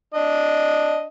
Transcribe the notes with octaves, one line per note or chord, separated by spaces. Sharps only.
D4 D#5